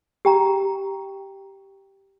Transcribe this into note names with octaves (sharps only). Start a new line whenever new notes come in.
G4 G5 A#5